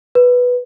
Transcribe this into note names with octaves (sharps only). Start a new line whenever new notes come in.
B4